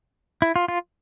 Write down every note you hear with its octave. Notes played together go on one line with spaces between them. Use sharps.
E4
F4
F4